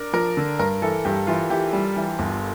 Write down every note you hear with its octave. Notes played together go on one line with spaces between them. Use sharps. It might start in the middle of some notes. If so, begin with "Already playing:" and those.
Already playing: D4 A#4
F3 A#4
D3
G2 A#4
E3 A4
G2 G4
E3 F4
E3 G4
G3
E3
G1